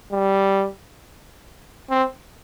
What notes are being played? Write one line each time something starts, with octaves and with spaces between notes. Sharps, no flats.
G3
C4